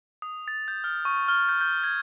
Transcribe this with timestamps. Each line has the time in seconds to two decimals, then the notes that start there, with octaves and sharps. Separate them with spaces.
0.22 D#6
0.48 A6
0.68 G6
0.84 F6
1.05 C#6
1.28 F6
1.49 G6
1.61 G6
1.84 G#6